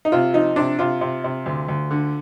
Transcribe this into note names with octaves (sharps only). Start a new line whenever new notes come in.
D#4
C3 F4
F3 D#4
C3 D4
C3 F4
C3
C3
D2
D2
D3